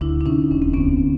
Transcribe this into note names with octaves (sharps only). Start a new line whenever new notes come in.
D2 D4 E4
D4
C3 C#4 D#4
E1 C#4
C4
D2 B3 C#4